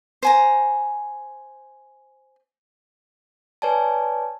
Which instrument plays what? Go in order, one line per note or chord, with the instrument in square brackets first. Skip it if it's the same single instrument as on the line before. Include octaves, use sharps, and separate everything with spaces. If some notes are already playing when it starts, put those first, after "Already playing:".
[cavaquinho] C5 G#5 A#5
[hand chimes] B4 C#5 D5 G#5 A5